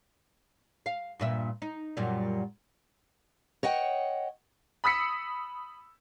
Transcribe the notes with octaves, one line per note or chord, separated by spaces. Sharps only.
F5
G2 A#2 E5
D#4
F#2 A#2 G3
C#5 D#5 F#5 G5
B5 D#6 E6 B6 C#7